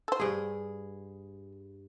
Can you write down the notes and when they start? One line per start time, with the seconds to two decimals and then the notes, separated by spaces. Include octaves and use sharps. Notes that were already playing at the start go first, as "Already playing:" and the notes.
0.08 A4 C5
0.19 G2 G#4